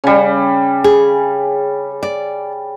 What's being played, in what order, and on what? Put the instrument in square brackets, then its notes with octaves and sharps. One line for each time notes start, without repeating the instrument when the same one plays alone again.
[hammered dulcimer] C#3 G3
[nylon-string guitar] G#4
D5